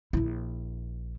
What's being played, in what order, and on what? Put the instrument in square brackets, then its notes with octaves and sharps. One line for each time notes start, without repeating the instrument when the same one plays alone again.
[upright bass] A#1 E4